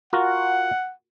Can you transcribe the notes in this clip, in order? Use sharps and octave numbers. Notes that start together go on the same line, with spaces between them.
F4 F#4 A#4 F#5